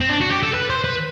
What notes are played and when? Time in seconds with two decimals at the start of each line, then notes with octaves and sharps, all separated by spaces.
0.01 C4
0.09 D4
0.21 F#4
0.31 G4
0.43 A4
0.54 B4
0.70 C5
0.84 B4